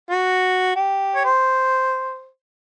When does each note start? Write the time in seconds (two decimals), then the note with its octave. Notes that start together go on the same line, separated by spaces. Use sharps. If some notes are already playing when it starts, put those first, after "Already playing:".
0.10 F#4
0.76 G4
1.15 C#5
1.25 C5